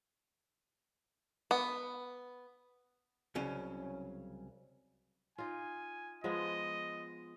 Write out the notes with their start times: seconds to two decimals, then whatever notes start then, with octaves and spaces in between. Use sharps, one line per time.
1.51 B3
3.35 C2 C#3 F#3 C#4
5.38 D#4 F4 G#5
6.24 F3 G#3 B3 D#5